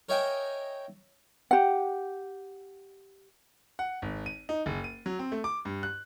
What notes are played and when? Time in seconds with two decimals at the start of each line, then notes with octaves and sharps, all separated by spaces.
0.09 A#4 C#5 D#5 E5 G5 G#5
1.51 G4 F#5
3.79 F#5
4.02 G#1
4.26 D#7
4.49 D#4
4.66 F#1
4.84 D#7
5.06 F#3
5.19 C4
5.32 A3
5.44 D6
5.65 G2
5.83 F#6